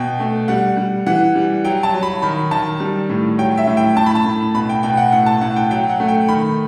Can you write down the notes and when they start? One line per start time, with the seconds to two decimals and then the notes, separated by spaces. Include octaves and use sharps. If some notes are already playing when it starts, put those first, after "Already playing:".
Already playing: B2 G5
0.19 A3
0.48 G3 F#5
0.77 G3
1.06 E3 F#5
1.35 G3
1.64 F#3 G5
1.83 A5
1.94 F#3
2.03 B5
2.22 D#3 B5
2.51 D#3 A5
2.80 G3
3.09 A2
3.38 F#3 G5
3.58 E5
3.67 A2
3.77 G5
3.96 A2 A5
4.06 B5
4.15 A5
4.26 A2
4.54 B2 B5
4.69 G5
4.83 B2 G5
4.97 F#5
5.12 A2 F#5
5.26 A5
5.41 A2 F#5
5.56 G5
5.71 F#3 G5
5.89 F#5
6.00 A3
6.08 G5
6.28 D#3 B5